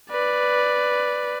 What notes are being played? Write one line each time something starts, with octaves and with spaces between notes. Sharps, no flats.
B4 D5